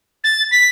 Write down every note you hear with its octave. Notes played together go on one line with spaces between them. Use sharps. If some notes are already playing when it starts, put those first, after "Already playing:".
A6
B6